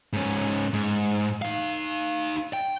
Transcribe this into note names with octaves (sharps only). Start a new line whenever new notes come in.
G#2 C#4
G#2
D#4 F5
G5